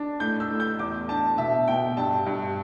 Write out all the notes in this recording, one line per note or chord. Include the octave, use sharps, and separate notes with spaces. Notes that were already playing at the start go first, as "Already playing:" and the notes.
Already playing: D4
A2 G6
E6
A2
G6
E2 D6
D4 A5
B2 E5
B2 G5
G2 A5
G2